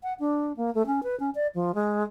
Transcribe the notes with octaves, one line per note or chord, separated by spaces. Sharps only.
F#5
D4
A#3
A3
C#4
B4
C#4
D5
F3
G#3